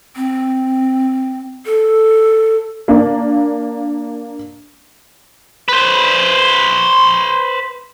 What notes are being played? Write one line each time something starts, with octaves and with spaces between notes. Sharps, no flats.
C4
A4
A#3 D4
B4 C5